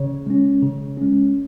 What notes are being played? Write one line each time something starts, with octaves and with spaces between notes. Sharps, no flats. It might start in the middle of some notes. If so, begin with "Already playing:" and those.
Already playing: C#3 C#5
G#3 C#4
C#3
G#3 C#4